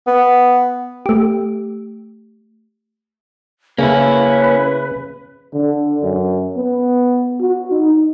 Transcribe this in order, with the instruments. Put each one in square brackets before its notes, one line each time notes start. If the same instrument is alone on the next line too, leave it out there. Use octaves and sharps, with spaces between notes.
[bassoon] B3
[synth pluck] A3 G4
[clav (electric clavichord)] C#3 [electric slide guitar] A#3 C#4 E4 [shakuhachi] B4
[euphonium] D3
F#2
B3
F#4
D#4